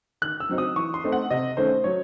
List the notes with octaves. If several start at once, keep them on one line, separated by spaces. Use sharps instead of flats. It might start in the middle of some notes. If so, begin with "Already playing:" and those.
D#3 F#6
E6
F#3 C4 D#4
D#6
E3 C#6
C6
A3 C4 D#4
F#5
C3 D#5
D#3 A3 C#4 C5
F#3 C#5